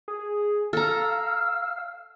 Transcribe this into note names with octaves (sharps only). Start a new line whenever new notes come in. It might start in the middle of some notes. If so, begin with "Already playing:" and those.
G#4
A4 F5 A#5 E6